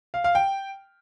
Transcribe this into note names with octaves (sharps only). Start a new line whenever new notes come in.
F5
F5
G5